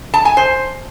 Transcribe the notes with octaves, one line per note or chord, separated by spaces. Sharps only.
A5
G#5
C5